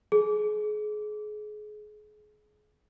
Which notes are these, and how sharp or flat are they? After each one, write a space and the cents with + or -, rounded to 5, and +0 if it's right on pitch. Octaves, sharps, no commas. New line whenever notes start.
G#4 +30